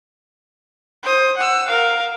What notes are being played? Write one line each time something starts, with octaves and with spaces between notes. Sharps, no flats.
C5 D#6
F#5 E6
A#4 F5